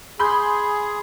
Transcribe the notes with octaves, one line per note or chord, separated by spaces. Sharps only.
G#4 B5 C6 G6